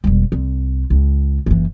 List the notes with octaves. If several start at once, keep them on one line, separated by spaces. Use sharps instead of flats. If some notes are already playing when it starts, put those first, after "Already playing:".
E1 G3
C2
C#2
F#1 E3